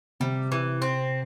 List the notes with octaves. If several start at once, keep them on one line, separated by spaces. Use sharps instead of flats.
C3 G3
E3
C4